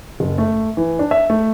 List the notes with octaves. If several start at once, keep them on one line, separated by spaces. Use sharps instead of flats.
F#1
A3
E3
D4
E5
A3